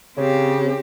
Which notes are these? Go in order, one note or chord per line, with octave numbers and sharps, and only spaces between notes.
C#3 C4 G4